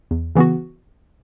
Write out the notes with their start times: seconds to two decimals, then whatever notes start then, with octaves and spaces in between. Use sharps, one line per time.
0.11 E2
0.35 C#3 E3 B3 F#4